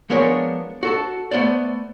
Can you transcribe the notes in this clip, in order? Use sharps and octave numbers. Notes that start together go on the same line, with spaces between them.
F3 G#3 B3 D4 A#4 C#5
F#4 A4 A5
A3 B3 C5 D5